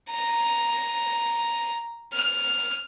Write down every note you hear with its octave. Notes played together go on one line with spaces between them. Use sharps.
A#5
F6